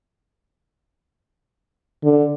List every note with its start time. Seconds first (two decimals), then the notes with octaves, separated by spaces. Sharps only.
2.04 D3